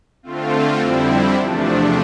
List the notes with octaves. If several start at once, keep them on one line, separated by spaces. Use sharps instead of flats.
D3 A3 C4 F4
F2 D3 G3 C4 E4
E2 C3 F3 A3 D4